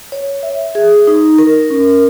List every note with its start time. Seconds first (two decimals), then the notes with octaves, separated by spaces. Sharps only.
0.12 C#5
0.43 E5
0.75 G#4
1.07 D#4
1.39 A#4
1.70 C#4